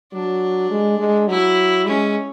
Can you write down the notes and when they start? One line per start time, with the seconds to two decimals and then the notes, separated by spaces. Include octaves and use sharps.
0.13 F#3 D4
0.71 G#3
0.99 G#3
1.28 F#3 E4
1.87 G#3 C#4